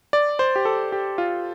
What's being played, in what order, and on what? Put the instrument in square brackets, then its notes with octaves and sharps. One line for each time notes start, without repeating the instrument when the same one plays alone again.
[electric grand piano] D5
C5
G4
A4
G4
F4